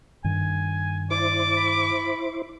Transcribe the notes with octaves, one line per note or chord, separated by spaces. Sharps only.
G2 D#3 G#5
E4 C5 D5 D6
B5